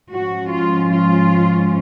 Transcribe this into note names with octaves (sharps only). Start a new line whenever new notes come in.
G#2 F3 G#3 C#4 F#4
F4
F4